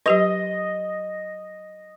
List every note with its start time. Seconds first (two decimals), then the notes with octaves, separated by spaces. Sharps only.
0.06 F#3 G4 B4 D#5